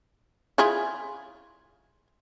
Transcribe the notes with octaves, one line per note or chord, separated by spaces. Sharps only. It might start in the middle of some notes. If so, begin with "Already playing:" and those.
E4 F4 G#4